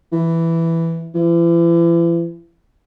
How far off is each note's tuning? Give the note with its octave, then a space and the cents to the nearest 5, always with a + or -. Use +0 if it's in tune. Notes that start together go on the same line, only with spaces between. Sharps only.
E3 +5
E3 +40